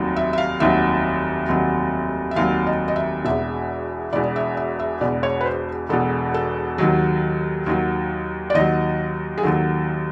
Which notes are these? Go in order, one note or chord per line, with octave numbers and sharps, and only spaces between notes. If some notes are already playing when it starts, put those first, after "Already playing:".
Already playing: F1 D#2 D#3 F#3
E5
E5
F5
F1 D#2 D#3 F#3 E5
F1 D#2 D#3 F#3
E5
F1 D#2 D#3 F#3 F5
D#5
D#5
E5
E1 E2 B2 E5
E1 E2 B2 D5
E5
E5
E5
E1 E2 B2 D5
C#5
B4
C5
E1 E2 B2 A4
A4
D#2 D#3 F#3
D#2 D#3 F#3
D5
D#2 D#3 F#3 D#5
G#4
D#2 D#3 F#3 A4